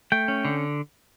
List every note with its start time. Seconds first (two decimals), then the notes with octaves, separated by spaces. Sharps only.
0.12 A3 G5
0.28 C#4
0.45 D3